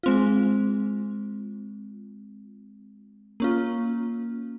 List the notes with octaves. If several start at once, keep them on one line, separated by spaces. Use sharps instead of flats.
G#3 C4 F4
A#3 C#4 F4